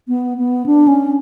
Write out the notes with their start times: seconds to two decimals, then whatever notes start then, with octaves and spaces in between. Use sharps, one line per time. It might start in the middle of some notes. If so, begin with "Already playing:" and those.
0.08 B3
0.38 B3
0.66 D4
0.87 C#4